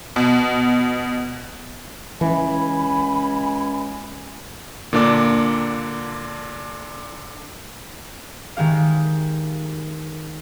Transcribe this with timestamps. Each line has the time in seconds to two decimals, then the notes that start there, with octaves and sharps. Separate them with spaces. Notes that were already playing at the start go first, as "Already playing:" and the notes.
0.16 B2
2.21 C#2 E3 G#5 B5
4.93 A#2 D3 A#3 D4 D5 D6
8.57 D#3 G#3 G4 F5